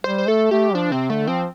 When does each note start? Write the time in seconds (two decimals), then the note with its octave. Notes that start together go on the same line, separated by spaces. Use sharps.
0.04 G3 C5
0.18 C5
0.28 A3 A4
0.51 A3 G4
0.75 F3 D4
0.92 C3 C4
1.10 D3 A3
1.27 F3 C4